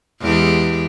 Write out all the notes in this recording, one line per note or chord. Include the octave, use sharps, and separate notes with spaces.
E2 G#3 G4